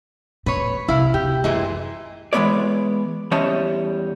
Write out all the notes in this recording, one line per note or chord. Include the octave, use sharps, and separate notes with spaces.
A#2 B4 C#5
C2 E4 F5
C3 G4
F#2 A#2 E3 G#3
E3 G#3 A3 B3 C#5 D5
E2 G3 C#4 C#5 D#5 A5